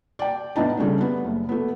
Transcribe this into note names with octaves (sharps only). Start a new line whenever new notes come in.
D5 G5
A2 B3 D4 D#4 A5
C#3 G3 A3 D4
B3
F#1
A3 B3